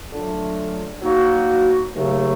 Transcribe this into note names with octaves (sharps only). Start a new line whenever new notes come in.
D3 F#3 A3 D4 F4
F#3 A#3 D#4 F#4
D#2 C#3 F#3 A3